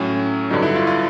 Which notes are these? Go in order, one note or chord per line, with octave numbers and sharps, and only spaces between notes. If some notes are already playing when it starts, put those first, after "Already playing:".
Already playing: A2 F#3 C#4
G2 D3 F#3 D#4
E4
F4
F4